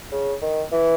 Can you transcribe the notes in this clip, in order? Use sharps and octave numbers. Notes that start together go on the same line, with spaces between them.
C#3
D#3
E3